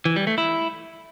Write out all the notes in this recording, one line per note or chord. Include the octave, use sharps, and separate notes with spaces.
E3
G3
A3
E4